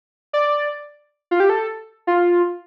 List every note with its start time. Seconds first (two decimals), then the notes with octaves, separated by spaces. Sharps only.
0.33 D5
1.31 F4
1.40 G4
1.50 A4
2.07 F4